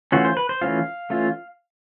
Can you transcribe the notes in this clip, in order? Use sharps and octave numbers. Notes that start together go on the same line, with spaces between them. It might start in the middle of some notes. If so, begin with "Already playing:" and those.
E3 A3 C#4 F4 F#4
C5
B4
C5
E3 A3 C#4 F4 F5
E3 A3 C#4 F4